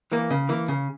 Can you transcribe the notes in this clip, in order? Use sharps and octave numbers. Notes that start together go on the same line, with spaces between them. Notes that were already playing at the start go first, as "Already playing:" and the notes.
E3 A#3
C#3
E3 A#3
C#3